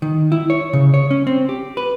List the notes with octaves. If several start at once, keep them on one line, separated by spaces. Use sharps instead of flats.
D#3
E4
C#5
C#3
C#5
C#4
C4
G4
B4